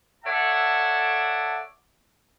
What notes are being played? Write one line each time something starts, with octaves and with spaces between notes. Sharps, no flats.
A4 C#5 D5 E5 F#5 A5